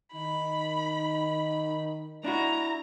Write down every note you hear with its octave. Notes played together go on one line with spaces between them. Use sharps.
D#3 D#4 B5
D4 E4 F#4 A#5